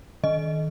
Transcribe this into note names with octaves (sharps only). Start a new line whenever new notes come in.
D#3 D#5